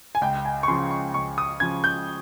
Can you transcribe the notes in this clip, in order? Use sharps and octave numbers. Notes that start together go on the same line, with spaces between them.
G#5
C#2 G5
G#5
C#6
C#3 F3 C6
C#6
C#2 C#6
D#6
C#3 F3 G#6
G6